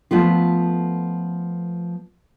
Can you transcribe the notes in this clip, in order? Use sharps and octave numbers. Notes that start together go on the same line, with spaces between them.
F3 A3 B3 F4